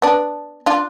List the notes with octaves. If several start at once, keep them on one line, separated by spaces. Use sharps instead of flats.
B3 D4
D4 F4